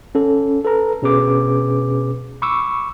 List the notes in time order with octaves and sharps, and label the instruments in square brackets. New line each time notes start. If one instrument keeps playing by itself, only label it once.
[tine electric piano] C#4 A4
A4 B4 A#5
B2 C#4 G#4 B4 D6
B5 C#6 D6 E6